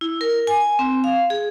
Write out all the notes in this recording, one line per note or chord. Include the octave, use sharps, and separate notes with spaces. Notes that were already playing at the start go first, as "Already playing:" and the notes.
E4
A#4
G#5
C4
F5
G#4